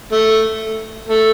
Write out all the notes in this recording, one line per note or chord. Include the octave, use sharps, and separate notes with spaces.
A3
A3